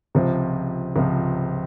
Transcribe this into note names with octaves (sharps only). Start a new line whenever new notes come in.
C#2 C3 F3
C#2 C3 F3